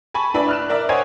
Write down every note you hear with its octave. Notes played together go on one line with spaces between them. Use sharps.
G#5 A5 B5 C#6
D4 E4 B4 D5 E5 B5
F6 F#6 E7
A#4 D5 E5
C5 C#5 D#5 F#5 G#5 G#6